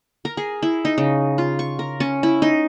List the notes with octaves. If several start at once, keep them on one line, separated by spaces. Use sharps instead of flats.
A#4
G#4
E4
D#4
C#3
F4
C#6
A#4
C#4
E4
D#4